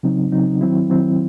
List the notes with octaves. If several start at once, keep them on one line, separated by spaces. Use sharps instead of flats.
C#3 F#3 C4 D#4
C#3 F#3 C4 D#4
D#3 F#3 C4 E4
D#3 F#3 C4 E4